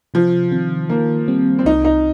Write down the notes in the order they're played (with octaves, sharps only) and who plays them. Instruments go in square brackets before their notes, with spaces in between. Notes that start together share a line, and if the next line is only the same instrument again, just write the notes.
[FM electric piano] C3 [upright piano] F3
[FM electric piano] D#3 C4
[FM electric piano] D#3 [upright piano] A#3
[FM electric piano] G3 C4
[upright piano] C4
[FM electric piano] C2 [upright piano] D#4
[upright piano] D#4